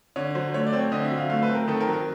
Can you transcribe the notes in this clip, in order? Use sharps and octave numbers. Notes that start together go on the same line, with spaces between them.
D3 C#5
F#3 C5
A3 C#5
D5
C4
C#5
D3 D#5
E5
F#3
F5
A3 F5
B4
C4
A#4
D#3 A4
A#4
F#3
A#4